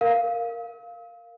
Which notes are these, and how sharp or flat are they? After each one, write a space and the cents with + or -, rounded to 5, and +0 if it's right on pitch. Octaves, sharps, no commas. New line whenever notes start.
A#4 +0 F5 +0